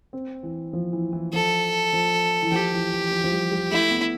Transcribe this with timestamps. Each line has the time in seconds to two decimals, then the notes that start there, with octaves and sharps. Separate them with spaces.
0.13 C4
0.43 E3
0.73 F3
0.93 E3
1.13 E3
1.33 F3 A4
1.93 F3
2.43 E3
2.52 F3 G4
2.73 E3
2.92 E3
3.11 F3
3.24 F3
3.32 G3
3.51 G3
3.71 A3 E4
3.91 B3